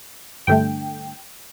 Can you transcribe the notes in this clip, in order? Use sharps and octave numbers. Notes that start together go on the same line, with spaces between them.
G2 D3 A3 G5